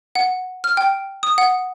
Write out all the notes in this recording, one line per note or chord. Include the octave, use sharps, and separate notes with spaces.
F#5
F6
G5
D#6
F#5